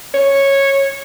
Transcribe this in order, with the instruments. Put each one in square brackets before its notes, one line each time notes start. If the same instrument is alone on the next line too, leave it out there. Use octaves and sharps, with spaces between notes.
[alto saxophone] C#5